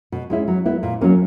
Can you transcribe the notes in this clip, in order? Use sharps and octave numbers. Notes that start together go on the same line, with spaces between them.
B2
G#3 C#4 E4
F#3
B3 E4
A#2
F#3 A#3 C#4